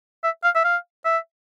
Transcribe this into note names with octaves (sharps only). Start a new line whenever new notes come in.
E5
F5
E5
F5
E5